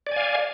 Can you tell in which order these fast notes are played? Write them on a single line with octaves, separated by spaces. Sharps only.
D5 G#5 F5